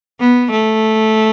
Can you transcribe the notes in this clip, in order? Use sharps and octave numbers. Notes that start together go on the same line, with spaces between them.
B3
A3